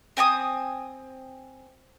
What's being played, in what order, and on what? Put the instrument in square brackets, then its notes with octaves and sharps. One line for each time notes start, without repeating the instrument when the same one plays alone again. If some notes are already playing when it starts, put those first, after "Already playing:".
[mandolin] C4 G#5 A#5 D#6